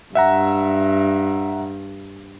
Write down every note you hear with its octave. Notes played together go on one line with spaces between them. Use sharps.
G2 E5 F#5 A#5